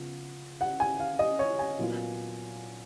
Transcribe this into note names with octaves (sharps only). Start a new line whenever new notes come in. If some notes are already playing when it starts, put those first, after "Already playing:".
Already playing: C#3 F3 B3
F#5
G#5
F5
D#5
C#5
G#5
A#2 F#3 B3 F4